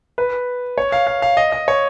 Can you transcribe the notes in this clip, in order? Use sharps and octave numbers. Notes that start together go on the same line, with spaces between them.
B4
C#5
F5
F5
F5
D#5
D#5
C#5